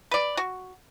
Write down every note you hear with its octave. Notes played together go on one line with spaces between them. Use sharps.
B4 D5
F#4